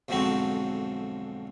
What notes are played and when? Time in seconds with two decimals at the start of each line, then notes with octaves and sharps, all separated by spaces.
0.08 B1 F2 G#2 D3 C4 F#4